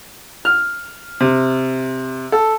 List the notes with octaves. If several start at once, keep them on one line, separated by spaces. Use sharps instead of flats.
F6
C3
A4